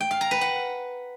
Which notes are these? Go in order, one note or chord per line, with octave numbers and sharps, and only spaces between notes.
G5
F5
A#5
B4
F#5